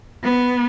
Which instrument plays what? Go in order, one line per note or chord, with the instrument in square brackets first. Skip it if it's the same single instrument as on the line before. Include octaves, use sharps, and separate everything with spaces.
[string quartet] B3